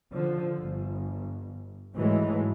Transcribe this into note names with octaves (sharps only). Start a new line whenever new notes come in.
D3 F3
G1
G#2 E3 F#3 G#3 A3